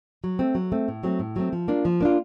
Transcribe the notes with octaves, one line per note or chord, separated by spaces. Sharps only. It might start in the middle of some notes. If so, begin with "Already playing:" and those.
F#3
A3 C4
F#3
A3 C4
A2
F#3 A3 C4
A2
F#3 A3 C4
F3
A#3 D4 F4
F3
A#3 D4 F4